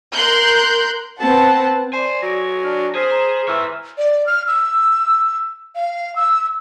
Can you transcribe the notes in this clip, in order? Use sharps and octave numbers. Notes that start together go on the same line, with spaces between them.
A#4 C6 F#6 G6
C4 B4 F#5 A5
C5 D5 G#5
F#3 A#6 D7
D4 F6
C4 G#4 C5 F6 B6 D#7
A#5 C6 E7
E3 C#5 E5 G#5 E6 F6
D5
F6
E6
F5
E6